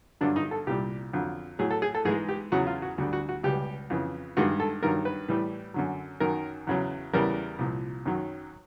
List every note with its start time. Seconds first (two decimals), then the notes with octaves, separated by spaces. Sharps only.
0.21 G2 D3 F#3 D4
0.36 D#4
0.51 A4
0.67 C2 A#2 G3 G4
1.13 F2 D3 F#3
1.59 A2 F#3 G#4
1.71 A4
1.82 G#4
1.95 A4
2.05 G#2 E3 G#3 G#4
2.29 G4
2.52 E2 C#3 F#3 F#4
2.67 F4
2.82 F#4
2.98 D2 D3 G3 F#4
3.13 F#4
3.29 F#4
3.43 C#2 B2 G3 G4
3.90 F2 C#3 E3
4.37 G2 D#3 G#3 F#4
4.60 A4
4.83 G2 D#3 F#3 A#4
5.05 B4
5.29 A2 E3 G3
5.74 F#2 D3 F#3
6.20 F#2 D#3 F#3 A#4
6.67 E2 C#3 F#3
7.13 E2 C#3 E3 G3 A#4
7.59 C2 A#2 F3
8.06 F#2 D#3 F#3